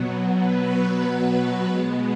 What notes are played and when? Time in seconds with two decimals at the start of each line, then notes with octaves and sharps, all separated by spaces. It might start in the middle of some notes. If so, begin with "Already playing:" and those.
Already playing: B2 F#3 B3
0.41 B4
1.66 B2 G#3 B3